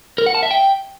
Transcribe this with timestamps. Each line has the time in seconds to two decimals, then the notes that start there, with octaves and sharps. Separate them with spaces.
0.18 A#4
0.26 F#5
0.35 A5
0.43 E5
0.51 G5